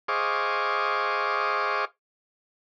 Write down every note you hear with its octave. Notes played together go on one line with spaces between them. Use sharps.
G#4 C5 D#5 F5 C#6 D6